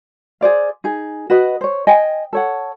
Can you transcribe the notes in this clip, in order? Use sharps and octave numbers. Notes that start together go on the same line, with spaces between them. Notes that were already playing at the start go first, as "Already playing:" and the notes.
G#4 C5 D5 F5
D#4 G#4
F#4 B4 D#5
C5 C#5
D#5 G5 G#5
A4 C#5 F#5